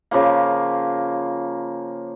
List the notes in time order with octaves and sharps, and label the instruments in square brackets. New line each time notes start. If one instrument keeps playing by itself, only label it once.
[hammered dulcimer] C#3 F3 A#3